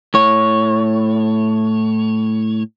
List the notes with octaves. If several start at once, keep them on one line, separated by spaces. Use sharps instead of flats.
A2 C#5